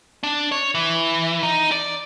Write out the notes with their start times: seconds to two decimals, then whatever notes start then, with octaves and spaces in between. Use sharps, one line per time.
0.23 D4
0.52 C#5
0.75 E3
1.43 D#4
1.72 D5